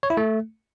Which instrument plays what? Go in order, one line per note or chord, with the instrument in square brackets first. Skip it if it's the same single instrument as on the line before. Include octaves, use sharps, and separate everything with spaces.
[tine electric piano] C#5
E4
A3